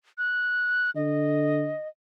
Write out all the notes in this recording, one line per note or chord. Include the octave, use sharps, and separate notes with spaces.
F#6
D3 D#5